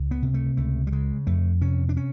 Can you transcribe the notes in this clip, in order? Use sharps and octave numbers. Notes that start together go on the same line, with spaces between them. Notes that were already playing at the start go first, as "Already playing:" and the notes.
Already playing: C#2
B3
C3
A3
C#2 A3
G3
C#3 G#3
F2 A3
C3 C#4
D4
C#4